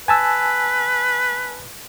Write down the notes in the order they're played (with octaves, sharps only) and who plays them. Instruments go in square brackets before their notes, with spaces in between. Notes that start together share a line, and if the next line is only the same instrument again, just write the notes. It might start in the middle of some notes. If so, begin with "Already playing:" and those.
[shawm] B4 [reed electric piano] G#5 A5 E6